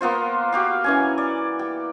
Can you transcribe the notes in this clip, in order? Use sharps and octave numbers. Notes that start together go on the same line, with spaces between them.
A#3 B3 F4 C5
F#4 G4 F5
E3 C#4 G#5
D5
G4